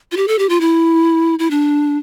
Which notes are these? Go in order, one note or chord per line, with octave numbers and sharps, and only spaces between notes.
F4
G4
A4
G4
F4
E4
E4
D4